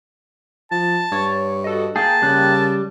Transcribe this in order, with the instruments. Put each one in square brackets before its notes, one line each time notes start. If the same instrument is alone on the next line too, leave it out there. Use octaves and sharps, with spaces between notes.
[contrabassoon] F3 [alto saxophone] A5
[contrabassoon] G2 [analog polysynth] C#5
[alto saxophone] F#4 [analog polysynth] A4 D#5
[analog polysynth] A#3 G5 [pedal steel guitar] G#4 [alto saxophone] A5
[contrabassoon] C#3 [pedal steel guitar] G3 F#6